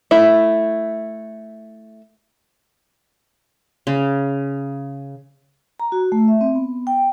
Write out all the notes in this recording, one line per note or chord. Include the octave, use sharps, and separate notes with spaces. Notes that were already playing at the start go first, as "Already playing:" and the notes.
A3 E4
C#3
A#5
F#4
A3
E5
C4
B3
G5